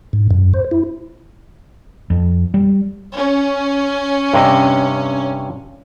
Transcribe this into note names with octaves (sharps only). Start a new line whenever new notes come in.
G#2
F#2
C5
E4
F2
G3
C#4
G2 C3 D#5